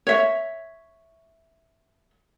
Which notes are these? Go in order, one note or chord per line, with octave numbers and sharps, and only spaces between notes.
C#5 E5